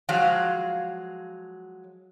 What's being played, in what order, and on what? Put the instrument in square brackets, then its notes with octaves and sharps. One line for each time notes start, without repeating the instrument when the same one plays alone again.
[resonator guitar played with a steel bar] F3 F#3 G#3 F5